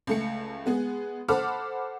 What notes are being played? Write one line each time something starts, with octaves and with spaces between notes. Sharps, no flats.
C#2 A3 C#7
G#3 B3 G#4
A4 C5 F#5 B5 D6 F6